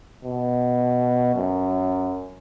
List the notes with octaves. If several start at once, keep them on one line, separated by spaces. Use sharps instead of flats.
B2
F#2